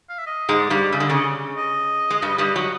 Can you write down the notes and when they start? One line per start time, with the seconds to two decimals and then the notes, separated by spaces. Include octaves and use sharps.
0.10 F5
0.18 E5
0.27 D#5
0.49 G#2 G#3
0.60 D5
0.70 G2 G3
0.92 C#3 E5
0.99 D3 D#5
1.07 D5
1.10 C#3 D#5
1.57 D#5
2.10 G#3
2.22 G2 G3
2.38 G2 G3
2.56 F#3